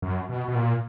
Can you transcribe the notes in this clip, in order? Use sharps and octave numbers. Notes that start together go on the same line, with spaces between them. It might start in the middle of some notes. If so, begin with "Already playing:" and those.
F#2
B2
B2
A#2